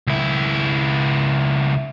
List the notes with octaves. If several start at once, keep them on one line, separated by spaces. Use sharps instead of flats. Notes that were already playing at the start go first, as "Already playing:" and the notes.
C#2 E4